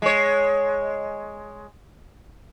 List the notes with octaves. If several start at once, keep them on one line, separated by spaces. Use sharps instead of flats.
G#3 C#5